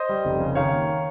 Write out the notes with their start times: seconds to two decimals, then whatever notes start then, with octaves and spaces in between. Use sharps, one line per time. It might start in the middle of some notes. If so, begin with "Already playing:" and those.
Already playing: C5 D#5
0.09 G3
0.25 F1
0.40 C#3
0.55 D#3 C#5 F5
0.72 A#3